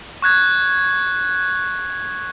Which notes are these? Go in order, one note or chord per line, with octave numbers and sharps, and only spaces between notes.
C#6 F#6 G#6